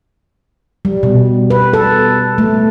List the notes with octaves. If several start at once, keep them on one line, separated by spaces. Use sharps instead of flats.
G3
B2
B4
A4
A3